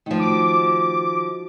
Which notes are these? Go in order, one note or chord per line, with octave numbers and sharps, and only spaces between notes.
D#3 F3 A3
F#4 D6